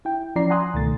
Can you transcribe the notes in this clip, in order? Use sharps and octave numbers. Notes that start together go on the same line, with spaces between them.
E4 G5
F3 C#4 E4 D5 A#5 C7
F#5 G#5 A#5 C6 D#6 F#6
C#2 B2 D#3 A3 A6